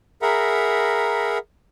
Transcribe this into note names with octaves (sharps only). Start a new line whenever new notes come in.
G#4 A#4 E5 F#5 A#5 B5